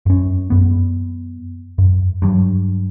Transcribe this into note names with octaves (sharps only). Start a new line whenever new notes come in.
F#2 C#4
F#2 B3
F#2
G2 F#3